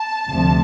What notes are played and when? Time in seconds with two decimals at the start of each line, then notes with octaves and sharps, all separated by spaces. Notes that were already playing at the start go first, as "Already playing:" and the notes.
Already playing: A5
0.26 D2 C3 F3